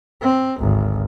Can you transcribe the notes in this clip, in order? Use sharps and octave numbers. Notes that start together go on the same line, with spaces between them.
C4
G#1 D2